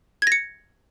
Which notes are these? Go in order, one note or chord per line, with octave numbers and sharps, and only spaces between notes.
G#6 A#6 C#7